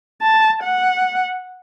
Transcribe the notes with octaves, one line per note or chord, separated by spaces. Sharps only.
A5
F#5